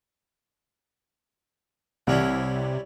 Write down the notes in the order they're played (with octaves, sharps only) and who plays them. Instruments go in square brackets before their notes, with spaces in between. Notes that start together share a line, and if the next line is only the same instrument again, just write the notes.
[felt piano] C2 [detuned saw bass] C3 [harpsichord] G3 C#4 E4